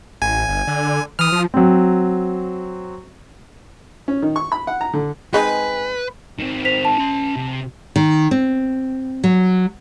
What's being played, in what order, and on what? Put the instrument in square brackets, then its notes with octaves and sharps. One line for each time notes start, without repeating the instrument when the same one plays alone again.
[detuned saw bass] A1 [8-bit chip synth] G#5
[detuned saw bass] G1
D3
[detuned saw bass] E3 [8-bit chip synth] D#6 F6
[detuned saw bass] F3
[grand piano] F#3 C4
[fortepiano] C#4
D#3
C#6
B5
F#5
A#5
D3
[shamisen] G#3 C4 D#4 [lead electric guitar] B4 [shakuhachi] G#5
[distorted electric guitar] D#3 C4
[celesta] C5 B6 F7
A5
[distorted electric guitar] C#4 C6
C3
[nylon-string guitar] D#3
C4
F#3